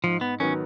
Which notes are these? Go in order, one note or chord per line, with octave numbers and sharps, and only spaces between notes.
G#2 F3
B3
D#3 F#3 B3 C#4